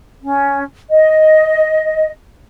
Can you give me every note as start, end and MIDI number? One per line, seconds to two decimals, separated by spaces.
0.23 0.64 61
0.91 2.10 75